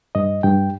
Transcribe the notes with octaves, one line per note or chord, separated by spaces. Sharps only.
G2 D#5
G2 G5